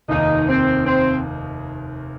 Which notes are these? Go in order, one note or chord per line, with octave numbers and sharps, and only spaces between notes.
F1 D#2 D#3 D#4
C4
C4